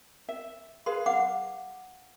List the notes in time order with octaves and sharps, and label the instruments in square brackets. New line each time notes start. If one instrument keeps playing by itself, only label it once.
[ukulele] E5
[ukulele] G#4 B4 F5 [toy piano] C6
[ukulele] F5 [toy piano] F#5 D6